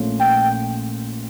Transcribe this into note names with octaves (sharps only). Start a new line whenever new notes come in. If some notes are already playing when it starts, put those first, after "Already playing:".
Already playing: A#1 A#2 A3 C#4 F4
G5